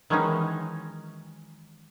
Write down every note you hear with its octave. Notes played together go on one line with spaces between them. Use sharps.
D#3 E3 F#3 G#3 C#4 D#4